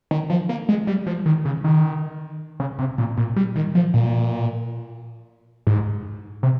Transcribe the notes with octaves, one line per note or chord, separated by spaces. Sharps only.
D#3
F3
A#3
G#3
G3
F3
D#3
C#3
D#3
C#3
C3
A#2
A#2
G3
D#3
F3
A#2
G#2
C3